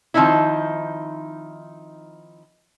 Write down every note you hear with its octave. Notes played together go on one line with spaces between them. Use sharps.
D#3 F3 C4 D#4 E4